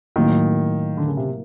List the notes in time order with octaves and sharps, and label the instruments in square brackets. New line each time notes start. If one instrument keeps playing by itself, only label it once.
[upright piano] A2 F#3 A#3 [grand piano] D#3
[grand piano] D3
C#3
C3